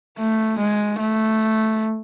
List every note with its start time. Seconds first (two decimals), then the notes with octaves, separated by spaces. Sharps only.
0.19 A3
0.59 G#3
0.99 A3